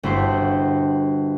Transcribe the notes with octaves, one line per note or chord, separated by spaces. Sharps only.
G1 E4 F#4 C5